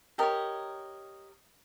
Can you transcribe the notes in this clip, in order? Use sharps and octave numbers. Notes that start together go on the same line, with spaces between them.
G4 A#4 C#5 D#5